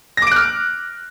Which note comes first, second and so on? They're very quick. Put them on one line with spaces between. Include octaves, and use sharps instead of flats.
A#6 D6 D7 F#6 F6